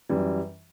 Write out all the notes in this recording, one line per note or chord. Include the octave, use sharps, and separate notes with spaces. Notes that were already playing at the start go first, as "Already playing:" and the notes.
F#2 E3 G3